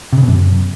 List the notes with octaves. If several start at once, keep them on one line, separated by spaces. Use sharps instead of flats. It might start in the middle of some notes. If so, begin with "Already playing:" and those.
C3
C#3
B2
F#2